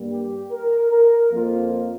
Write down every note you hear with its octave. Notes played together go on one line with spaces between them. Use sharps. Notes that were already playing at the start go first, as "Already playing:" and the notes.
Already playing: G2 G3 A#3
G4
A#4
A#4
F2 F3 A#3 F4